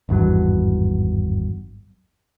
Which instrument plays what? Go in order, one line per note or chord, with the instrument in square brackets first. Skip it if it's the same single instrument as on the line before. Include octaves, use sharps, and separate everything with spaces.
[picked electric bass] G#1 E2 G2 F#3